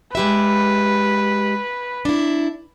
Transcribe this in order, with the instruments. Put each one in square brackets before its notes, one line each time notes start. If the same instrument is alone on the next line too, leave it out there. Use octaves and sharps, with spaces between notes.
[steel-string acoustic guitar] G#3 G4 E5 [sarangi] B4
[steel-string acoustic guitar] D4 E4